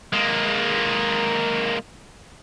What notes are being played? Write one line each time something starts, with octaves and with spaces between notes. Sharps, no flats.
G#3 A#3